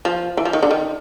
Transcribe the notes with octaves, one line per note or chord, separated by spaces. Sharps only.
F3
E3
F3
D#3
D3
D#3